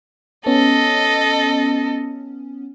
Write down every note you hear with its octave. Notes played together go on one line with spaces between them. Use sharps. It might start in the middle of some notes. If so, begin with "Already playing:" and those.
B3 C#4 A4 D#5